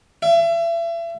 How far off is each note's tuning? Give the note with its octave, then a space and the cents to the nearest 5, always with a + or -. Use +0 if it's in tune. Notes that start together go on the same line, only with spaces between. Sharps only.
E5 +35